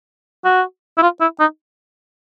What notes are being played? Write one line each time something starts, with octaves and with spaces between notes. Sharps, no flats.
F#4
E4
F4
E4
D#4